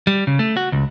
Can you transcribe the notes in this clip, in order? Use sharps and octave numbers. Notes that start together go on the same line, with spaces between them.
G3
C#3
A3
F#4
C#2